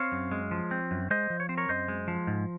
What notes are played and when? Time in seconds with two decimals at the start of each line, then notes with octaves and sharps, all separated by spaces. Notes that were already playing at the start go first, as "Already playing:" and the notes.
Already playing: C4 C#5 F5
0.12 F#2
0.31 G#3
0.51 F3
0.71 C4
0.91 F#2
1.10 G#3 C5 D#5
1.30 F3
1.40 C#5
1.49 C4 C5
1.57 A#4 C#5
1.69 F#2 C5 D#5
1.88 G#3
2.08 F3
2.27 G#2